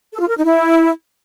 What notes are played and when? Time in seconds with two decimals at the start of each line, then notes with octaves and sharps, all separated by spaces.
0.13 A4
0.21 F4
0.29 A#4
0.37 D#4
0.45 E4